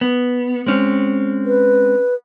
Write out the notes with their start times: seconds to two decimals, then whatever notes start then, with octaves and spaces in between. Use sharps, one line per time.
0.01 B3
0.66 G#3 C4 C#4
1.46 B4